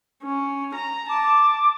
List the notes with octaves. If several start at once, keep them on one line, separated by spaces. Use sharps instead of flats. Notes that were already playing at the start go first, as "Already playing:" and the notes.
C#4
A#5
A5 D6